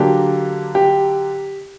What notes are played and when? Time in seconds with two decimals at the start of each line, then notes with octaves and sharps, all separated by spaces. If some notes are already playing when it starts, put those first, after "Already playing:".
Already playing: D3 F#3 A#3 D4 G4
0.75 G4